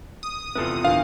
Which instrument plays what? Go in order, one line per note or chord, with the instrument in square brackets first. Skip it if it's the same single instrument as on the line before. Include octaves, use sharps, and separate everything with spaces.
[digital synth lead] D#6
[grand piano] E2 C3 [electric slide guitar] F4 A4 B4
[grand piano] E2 A#2 D3 [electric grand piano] F5